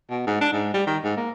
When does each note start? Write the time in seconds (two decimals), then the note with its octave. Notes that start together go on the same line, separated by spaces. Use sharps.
0.10 B2
0.27 G#2
0.41 D4
0.53 G#2
0.74 G3
0.87 D#3
1.04 G#2
1.17 A#3